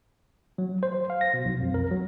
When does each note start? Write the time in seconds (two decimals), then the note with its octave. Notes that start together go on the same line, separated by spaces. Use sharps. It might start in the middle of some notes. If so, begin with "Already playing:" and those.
0.58 F#3
0.83 C5
1.10 F5
1.21 A#6
1.34 B2
1.45 B1
1.60 F2
1.74 A#4
1.91 F#3